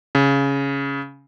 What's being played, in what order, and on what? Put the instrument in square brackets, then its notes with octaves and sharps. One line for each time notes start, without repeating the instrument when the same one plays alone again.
[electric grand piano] C#3